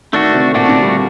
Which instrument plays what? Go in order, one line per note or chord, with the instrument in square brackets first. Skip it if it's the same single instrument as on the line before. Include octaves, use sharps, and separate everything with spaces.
[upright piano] D#3 [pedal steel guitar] A3 D4 F#4
[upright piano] C3
[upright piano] A#2 [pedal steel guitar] A3 D4 F#4
[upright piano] D3
G3